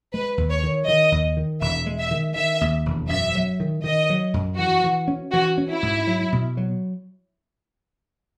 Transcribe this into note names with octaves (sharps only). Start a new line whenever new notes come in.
G#3 B4
D#2
C#5
D#3
D#3 D#5
D#2
D#3
E1 E5
G#3
E5
D#3
D#3 E5
D#2
E1
F#2 E5
F#3
D#3
D#3 D#5
F#3
F#2
E3 F#4
E3
C#4
E3 F#4
C#4
E4
G#2
F#3
B2
F#3